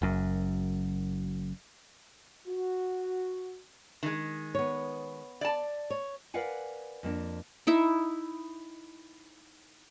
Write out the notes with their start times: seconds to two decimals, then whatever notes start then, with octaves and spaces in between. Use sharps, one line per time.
0.02 F#1 F#2
2.48 F#4
4.03 D#3 G#3
4.55 B3 C#5
5.41 D5 A5
5.90 C#5
6.34 A#4 B4 D5 F5 F#5 G#5
7.03 F2 A#3 C4 D4
7.67 D#4 E4 E5